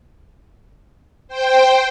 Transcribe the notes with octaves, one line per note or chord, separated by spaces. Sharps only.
C5 G5